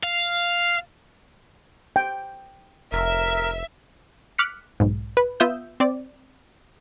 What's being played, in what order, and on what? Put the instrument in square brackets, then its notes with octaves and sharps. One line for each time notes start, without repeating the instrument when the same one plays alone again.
[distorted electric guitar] F5
[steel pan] G5
[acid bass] F1 [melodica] A#4 [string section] E5
[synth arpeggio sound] D6 F6 F#6 B6 C#7
B1 G#2
B4
B3 F4 E5 D#6 E6 G6
C4 D5